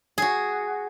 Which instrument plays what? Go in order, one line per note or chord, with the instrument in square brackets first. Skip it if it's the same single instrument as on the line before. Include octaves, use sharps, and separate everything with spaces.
[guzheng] F#4 G#4